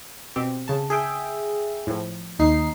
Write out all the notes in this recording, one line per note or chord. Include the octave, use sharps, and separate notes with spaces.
B2 C4 G4
C#3 A5
G#4 E5 G5
A2 F3
D#2 D#4 C7